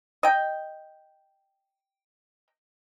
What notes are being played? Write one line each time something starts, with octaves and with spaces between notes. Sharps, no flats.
D#5 G5